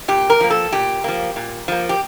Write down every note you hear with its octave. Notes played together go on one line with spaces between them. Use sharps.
A#2 G4
A#4
F3 A#3
A4
A#2 G4
F3 A#3
A#2
F3 A#3
G4